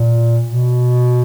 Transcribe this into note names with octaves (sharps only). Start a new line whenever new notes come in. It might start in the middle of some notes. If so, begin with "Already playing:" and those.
Already playing: A#2
B2